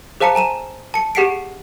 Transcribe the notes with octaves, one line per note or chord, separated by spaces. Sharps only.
G#4 C5 F5 A5 A#5 C#7
G#5 A#5 D#7 E7
A5 C#7
G4 G#4 F#5 B6 C7 D7